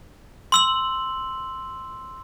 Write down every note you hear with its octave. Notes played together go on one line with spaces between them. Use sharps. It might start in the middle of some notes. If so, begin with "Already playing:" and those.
C6 E6 F#7